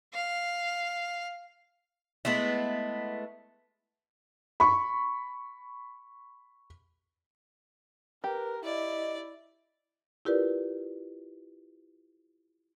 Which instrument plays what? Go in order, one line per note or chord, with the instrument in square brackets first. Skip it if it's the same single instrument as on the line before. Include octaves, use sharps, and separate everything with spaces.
[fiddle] F5
[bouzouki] G#3 A3 B3 E4
[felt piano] B5 C#6
[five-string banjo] G4 [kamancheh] A#4 [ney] B4
[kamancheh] E4 [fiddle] D5 [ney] D#5
[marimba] E4 F4 G4 A#4 B4 D5